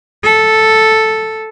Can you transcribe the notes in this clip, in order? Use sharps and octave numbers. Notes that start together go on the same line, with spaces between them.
A4